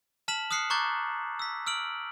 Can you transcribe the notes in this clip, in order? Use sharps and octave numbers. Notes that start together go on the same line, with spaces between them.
A5 F6 B6 E7 F#7
D#6 F6 F#6 C7 C#7
A#5 C#6 D6 F#6 G6 A6
E6 B6
E6 F6 D7 F#7